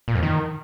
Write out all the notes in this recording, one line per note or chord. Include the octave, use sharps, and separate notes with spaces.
A#2
F2
D#3